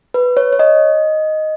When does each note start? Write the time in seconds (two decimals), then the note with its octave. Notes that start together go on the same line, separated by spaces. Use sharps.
0.14 B4
0.37 C#5
0.53 C#5
0.59 D#5